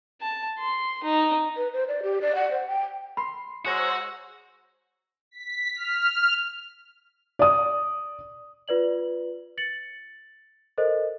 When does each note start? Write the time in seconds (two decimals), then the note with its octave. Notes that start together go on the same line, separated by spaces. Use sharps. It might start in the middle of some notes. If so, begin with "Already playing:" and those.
0.21 A5
0.59 C6
1.03 D#4
1.56 B4
1.73 C5
1.88 D5
2.03 G4
2.22 D5
2.35 F#5
2.51 C5
2.67 G5
3.17 B5 C6
3.65 G#3 F#4 C5 C#5 F#5 A#5 E6
5.31 B6
5.76 F6
7.39 D5 D#6
8.68 F4 B4 D5 F#7
9.58 A6 C#7 F#7
10.78 A4 A#4 C5 D#5